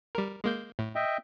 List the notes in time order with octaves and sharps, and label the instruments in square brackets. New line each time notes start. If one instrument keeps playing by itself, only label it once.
[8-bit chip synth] G3 A#4
G#3 A#3 G6
A2
[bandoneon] D#5 E5 G5